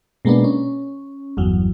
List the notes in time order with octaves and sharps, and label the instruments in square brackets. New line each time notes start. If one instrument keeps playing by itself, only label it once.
[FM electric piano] B2 G#3 A#3 B3 D4
C#4
G1 E2 F#3